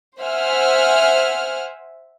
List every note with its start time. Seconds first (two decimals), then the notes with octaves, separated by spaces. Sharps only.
0.20 C5 E5 F#5 G#5 F6